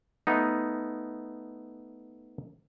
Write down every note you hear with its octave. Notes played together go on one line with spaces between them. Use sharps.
A3 B3 D#4